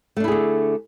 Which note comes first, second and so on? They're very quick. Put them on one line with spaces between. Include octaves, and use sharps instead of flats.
A3 D4 E4 G#4 D3